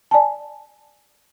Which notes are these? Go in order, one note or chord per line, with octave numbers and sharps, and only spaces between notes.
D5 G#5 A5